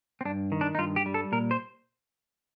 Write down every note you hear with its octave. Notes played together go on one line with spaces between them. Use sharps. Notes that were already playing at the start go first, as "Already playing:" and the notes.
C4
G2 D4
D#3
D4
D#4
G2 F4
G4
G3
A4
A#2 A#4
C5